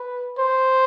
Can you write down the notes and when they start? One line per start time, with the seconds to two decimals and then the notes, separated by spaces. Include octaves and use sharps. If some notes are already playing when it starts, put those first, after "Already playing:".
Already playing: B4
0.39 C5